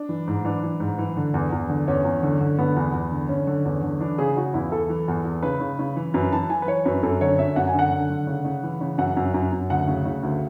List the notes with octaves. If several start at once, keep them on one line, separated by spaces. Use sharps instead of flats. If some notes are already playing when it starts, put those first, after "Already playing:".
Already playing: D4
E3
G#2
E3 D4
E3
G#2
E3
D3
E2
E2
D3
E2 C#4
E2
D3
D3
D3 B3
E2
E2
D3
D3 C#4
D3
E2
D3
E3 D4
C#3 G#4
C#3 F#4
E2 E4
E2 A4
E3
E2
E2
C#3 B4
C#3
C#3
E3
F#2 B4
E3 A5
E3 G#5
B4
E3 C#5
F#2 B4
F#2 A4
D3 C#5
F#2 E5
F#2 F#5
G#5
D3 F#5
D3
D3
C#3
C#3
E3
C#3
F#2 F#5
F#2
F#2
F#2
D2 F#5
C#3
C#3
D2